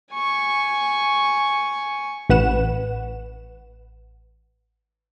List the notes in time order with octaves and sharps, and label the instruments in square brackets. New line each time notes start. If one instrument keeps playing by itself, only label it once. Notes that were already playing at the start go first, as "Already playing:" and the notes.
[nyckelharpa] G#5 C#6
[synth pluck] A1 B4 F#5 E7